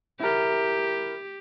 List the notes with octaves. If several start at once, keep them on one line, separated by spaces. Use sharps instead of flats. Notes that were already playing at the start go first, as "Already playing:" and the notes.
E4 G4 A#4